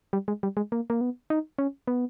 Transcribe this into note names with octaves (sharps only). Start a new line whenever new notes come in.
G3
G#3
G3
G#3
A#3
A#3
B3
D#4
C#4
B3